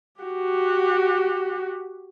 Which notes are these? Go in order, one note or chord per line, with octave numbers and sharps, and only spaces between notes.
F#4 G4